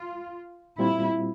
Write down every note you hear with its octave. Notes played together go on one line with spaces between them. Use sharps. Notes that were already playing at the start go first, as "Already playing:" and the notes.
Already playing: F4
A#2 G3 C4 E4 F4